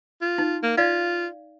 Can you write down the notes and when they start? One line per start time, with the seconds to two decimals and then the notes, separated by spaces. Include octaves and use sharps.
0.22 F4
0.38 D#4
0.63 A#3
0.78 F4 D5 F5